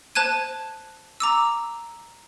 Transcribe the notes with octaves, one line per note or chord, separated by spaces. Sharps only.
C5 A5 F#6 G#6 D#7
A#5 D6 E6